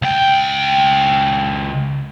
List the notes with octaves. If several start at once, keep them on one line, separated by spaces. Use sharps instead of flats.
C#2 G5